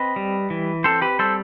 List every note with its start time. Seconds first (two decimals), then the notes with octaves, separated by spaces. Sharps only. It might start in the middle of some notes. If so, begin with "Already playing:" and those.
Already playing: C4 B4 D#5
0.16 G3
0.50 E3
0.84 C4 A4 C5
1.01 G4 B4
1.19 G3 A4 C5